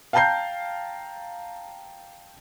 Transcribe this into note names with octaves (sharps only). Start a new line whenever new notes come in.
F5 G5 A5 A#5 G6 C7